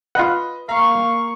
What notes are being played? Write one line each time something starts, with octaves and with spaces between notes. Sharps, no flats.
F4 B4 D#5 F#5
A#3 F5 A#5 C#6